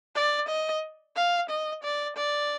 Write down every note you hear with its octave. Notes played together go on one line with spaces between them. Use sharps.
D5
D#5
F5
D#5
D5
D5